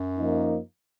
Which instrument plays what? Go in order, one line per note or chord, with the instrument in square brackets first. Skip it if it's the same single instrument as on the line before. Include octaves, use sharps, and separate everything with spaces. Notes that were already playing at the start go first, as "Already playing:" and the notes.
Already playing: [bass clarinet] F#2
[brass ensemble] F3 A#3 D#4